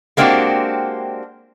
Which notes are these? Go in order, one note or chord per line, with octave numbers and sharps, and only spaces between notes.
G#3 A#3 C4 D4 F#4 G4